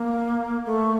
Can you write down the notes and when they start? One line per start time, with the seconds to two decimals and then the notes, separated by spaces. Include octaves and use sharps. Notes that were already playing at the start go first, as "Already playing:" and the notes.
Already playing: A#3
0.65 A3